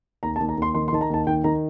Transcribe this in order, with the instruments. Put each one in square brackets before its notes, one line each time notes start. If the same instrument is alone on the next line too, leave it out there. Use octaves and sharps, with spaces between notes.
[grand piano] D#2 A#5
A5
D#2
A#5
D#2 C6
D#3 C6
C6
D#3 A5
A#5
D#2 A5
D#3 G5
D#3 A#5